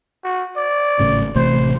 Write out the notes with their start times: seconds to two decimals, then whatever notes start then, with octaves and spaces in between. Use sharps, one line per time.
0.24 F#4
0.56 D5
1.00 G#1 A2 C#3
1.35 A1 C3 A3 C5